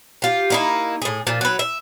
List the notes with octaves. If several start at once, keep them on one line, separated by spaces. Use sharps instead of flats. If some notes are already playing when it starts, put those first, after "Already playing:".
F4 G4
A#3 D#4 E4
A2 G#4
A#2 F3
F#3 B4
E5